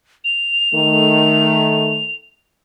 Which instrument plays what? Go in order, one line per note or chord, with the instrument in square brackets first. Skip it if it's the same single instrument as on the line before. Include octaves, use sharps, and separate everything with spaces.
[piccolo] F7
[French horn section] D#3 A3